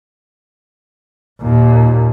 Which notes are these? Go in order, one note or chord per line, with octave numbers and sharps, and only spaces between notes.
D#2 A#2